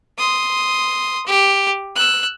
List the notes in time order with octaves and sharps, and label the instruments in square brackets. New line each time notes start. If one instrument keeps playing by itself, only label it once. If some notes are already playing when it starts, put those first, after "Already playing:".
[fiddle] C6 D#6
G4
E6 F#6